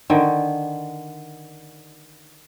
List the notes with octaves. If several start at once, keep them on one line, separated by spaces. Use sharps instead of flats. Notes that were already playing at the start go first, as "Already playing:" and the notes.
D3 D#3